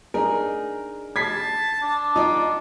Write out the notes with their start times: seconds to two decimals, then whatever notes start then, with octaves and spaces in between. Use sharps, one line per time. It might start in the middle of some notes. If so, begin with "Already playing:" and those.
0.14 D4 D#4 G#4 A#4
1.16 A5 G#6 B6 C7
1.82 D4
2.16 D#4 F4 D5 G5